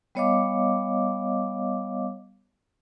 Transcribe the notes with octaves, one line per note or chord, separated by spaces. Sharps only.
G3 B3 C#5 D#5 F5 D6